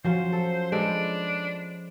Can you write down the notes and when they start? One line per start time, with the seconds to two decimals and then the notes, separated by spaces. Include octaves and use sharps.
0.05 F3 F#3 C#4 F4 C5
0.32 A4
0.72 G#3 D4 A4 B4